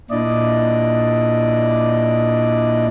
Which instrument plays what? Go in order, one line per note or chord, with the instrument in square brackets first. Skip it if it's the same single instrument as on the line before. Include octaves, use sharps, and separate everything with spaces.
[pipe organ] A#2 D4 E4 D5 D#5